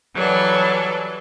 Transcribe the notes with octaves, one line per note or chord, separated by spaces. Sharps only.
E3 F#3 G3 A4